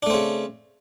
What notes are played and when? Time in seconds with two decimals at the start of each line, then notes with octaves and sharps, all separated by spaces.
0.03 D4
0.06 A3
0.10 C4
0.14 C#3